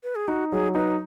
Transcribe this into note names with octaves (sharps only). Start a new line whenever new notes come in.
B4
G#4
D#4 F#4
F#3 G#4
D#4 B4